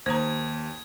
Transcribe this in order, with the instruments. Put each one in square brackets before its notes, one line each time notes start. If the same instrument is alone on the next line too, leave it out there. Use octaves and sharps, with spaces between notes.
[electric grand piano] D#2 D#6 [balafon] C5 A#5 [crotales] G#6